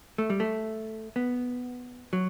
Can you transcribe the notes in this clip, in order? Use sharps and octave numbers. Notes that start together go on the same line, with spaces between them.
A3
G3
A3
B3
F#3